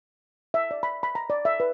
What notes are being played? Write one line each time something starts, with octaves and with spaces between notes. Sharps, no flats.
E5
D5
B5
B5
A#5
D5
E5
B4